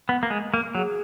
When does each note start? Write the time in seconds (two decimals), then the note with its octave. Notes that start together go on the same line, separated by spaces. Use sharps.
0.09 B3
0.23 A#3
0.30 G#3
0.54 A#3
0.75 F#3 G#4